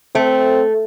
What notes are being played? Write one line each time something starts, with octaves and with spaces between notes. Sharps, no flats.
A3 C4